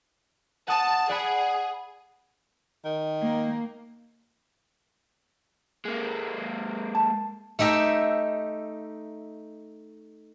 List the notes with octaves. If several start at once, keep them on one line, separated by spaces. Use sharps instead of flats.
F#5 A5 D#6
G#4 D5 F#5 B5
D#3
A#3
G#3 A#3
A5
A3 D#4 G4 E5